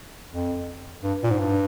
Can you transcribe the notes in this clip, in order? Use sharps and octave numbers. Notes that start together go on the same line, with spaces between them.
F2
G2
A#2
G#2
G2